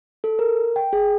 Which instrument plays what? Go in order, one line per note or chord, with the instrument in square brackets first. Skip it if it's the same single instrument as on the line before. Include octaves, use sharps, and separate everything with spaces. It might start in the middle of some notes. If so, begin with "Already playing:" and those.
[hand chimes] A4
A#4
G5
G#4